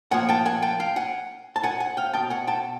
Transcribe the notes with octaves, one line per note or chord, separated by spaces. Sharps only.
A#2 F3 A#3 F#5 G#5
G5 A5
F#5 G#5
G5 A5
F5 G5
F#5 G#5
A5
F#5 G#5
F#5 G#5
F5 G5
B2 G#3 G5 A5
F#5 G#5
G5 A5